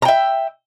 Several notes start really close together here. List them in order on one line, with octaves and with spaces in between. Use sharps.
A#5 G5 E5